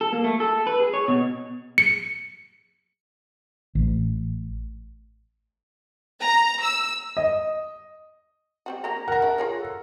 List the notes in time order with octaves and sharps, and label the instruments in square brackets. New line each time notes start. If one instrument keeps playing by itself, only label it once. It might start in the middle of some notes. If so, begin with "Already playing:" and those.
[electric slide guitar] A4
A#3
A3
A4
B4
G#4
C#5
B2
[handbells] C#7
[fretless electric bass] A1
[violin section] A#5
E6
[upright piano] D#5
[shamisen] G3 C4 F#4
[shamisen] F#3 A#3 D4 [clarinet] A#5
[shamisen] F#4 [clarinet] A#4 [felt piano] F#5 A#5
[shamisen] A3 D4 E4
F4 G#4 C#5
[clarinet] A4